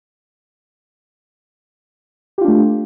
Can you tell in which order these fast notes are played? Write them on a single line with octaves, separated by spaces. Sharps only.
G4 F4 D4 A3